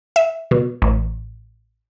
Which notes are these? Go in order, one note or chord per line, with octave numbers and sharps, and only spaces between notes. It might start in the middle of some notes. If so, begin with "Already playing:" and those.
E5
B2
A1